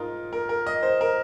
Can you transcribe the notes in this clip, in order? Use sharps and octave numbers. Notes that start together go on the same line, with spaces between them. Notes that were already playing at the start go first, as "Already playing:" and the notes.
Already playing: G#2 G#3 D#4 F4 A#4
A#4
A#4
D#5
C5
A#4